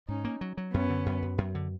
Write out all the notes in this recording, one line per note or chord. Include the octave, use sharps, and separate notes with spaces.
G#2 C#4 D#4
A#3
F#3
F#3
F#2 B3 C#4
D3
F#2
F#2
F#2
D3